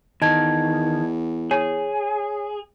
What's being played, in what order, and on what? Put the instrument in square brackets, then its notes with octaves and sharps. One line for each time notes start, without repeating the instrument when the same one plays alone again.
[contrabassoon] E2 [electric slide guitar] D#3 [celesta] D#5 A5 G#6
[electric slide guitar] G#4 [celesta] C#5